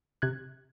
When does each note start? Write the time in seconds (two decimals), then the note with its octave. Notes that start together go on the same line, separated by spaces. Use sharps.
0.22 C3 F#6 G#6